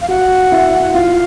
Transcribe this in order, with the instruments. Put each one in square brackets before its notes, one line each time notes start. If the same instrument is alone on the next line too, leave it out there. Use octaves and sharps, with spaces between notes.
[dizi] F5
[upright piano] F#4 [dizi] F#5
[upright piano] E4
[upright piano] F4 [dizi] F5